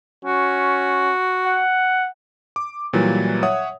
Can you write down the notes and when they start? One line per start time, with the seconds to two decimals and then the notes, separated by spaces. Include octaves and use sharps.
0.25 C#4 F#4
1.46 F#5
2.56 D6
2.93 A#2 E3 F#3 G3
3.43 C#5 E5 F#5 D#6